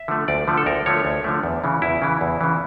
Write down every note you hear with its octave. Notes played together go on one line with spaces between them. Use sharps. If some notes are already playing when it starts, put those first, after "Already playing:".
Already playing: E5
D3 F3 A3
D2 D5
D3 F3 A3
A4
D2 A#4
D3 F3 A3 C#5
D2
D3 F3 A3
E2
C#3 E3
E2 E4
C#3 E3
E2
C#3 E3